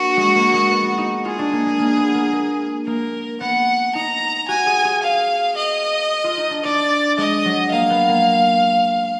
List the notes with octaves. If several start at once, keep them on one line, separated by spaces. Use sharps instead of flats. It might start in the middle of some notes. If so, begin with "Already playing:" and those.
Already playing: A#3 D4 F#4
G#3
A#3
G#3
B3
D#4
F4 G#4
D4
A#3
G#3
A#3
B3
A#3
A#3
A#3 A#4
B3 F#5
D#4 A#5
F#4 G#5
G#4
G#4
F5
D#5
F4
D#4
D4
D4 D5
G#3 D#5
F#3
A#3 F5
B3
A#3